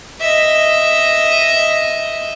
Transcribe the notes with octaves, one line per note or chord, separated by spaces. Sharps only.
D#5 E5